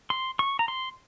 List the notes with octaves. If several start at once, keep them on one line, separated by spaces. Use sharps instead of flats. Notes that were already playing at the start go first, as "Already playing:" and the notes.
C6
C#6
A#5
C6